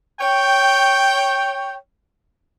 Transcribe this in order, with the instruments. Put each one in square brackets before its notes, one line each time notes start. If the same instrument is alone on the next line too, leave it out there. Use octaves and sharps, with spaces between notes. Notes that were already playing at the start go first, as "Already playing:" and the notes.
[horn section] C#5 G5